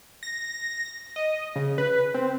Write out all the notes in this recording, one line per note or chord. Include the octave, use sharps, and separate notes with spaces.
A#6
D#5
C#3
B4
C4